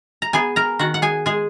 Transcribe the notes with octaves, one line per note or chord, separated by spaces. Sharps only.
A#5
B3 G#4 G#5
A#4 A#5
D#3 F#4 F#5
F#5
G#4 G#5
G#3 G#4 G#5